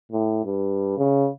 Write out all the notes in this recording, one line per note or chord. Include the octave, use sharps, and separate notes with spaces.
A2
G2
C#3